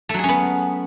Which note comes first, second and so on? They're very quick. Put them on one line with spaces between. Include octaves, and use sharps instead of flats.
A3 F#3 G#4 C#4 B3